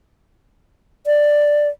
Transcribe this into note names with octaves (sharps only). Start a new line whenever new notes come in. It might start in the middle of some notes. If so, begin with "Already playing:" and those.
D5